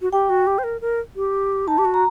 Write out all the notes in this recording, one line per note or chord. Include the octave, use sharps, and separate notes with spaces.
F#4
G4 G5
F#4
G4
C5
A#4
A#4
G4
D#4 A5
G4
F#4
A#5